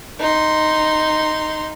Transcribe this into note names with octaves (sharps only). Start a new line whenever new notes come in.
D#4 C6